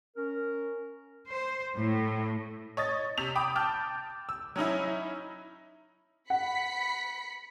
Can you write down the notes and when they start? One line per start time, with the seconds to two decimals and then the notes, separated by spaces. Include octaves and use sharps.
0.17 C#4 A#4
1.31 C5
1.77 A2
2.77 C#5 D#5 A6
3.17 C3 F7
3.36 G5 B5 D6 D#6
3.56 G5 A5 D6 F6 G6
4.29 E6
4.56 F#3 C#4 D#4 E4
6.30 F#5 B5 B6 C#7